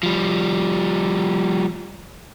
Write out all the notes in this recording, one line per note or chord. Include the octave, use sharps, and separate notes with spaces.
F3 G3